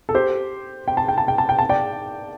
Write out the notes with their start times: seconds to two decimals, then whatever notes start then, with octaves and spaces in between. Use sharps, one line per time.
0.09 A4
0.14 G4 C5
0.88 G5
0.97 A5
1.08 G5
1.18 A5
1.28 G5
1.38 A5
1.49 G5
1.59 A5
1.69 D5 G5